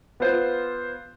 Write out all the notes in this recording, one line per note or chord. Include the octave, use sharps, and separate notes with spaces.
B3 F4 C5